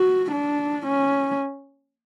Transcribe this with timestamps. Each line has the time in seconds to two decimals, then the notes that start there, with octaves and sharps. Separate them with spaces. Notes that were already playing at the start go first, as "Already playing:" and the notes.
Already playing: F#4
0.32 D4
0.87 C#4